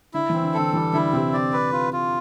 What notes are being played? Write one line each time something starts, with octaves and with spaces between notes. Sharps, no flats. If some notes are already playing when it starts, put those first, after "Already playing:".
D3 E4
E3
C4
D3
D3 A4
E3 G3
D3 E4
C3 C4
D5
B4
F4
F4